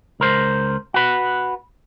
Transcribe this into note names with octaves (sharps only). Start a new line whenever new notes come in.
C#2 A#4 C5
F#4 B4